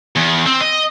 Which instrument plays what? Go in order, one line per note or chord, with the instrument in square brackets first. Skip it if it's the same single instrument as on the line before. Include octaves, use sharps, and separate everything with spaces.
[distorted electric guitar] E2
C4
D#5